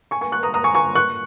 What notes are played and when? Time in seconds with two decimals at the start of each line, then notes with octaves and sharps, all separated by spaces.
0.11 G#5 C#6
0.21 G#5 C#6
0.32 C#6 F#6
0.43 A#5 D#6
0.54 A#5 D#6
0.64 G#5 C#6
0.75 G#5 C#6
0.95 C#6 F#6